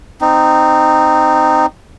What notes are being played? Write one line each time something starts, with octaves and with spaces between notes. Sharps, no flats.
C4 D#4